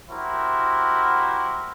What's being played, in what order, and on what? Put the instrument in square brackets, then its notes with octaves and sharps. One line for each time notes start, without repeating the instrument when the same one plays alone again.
[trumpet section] E4 F#4 G4 A#4 C5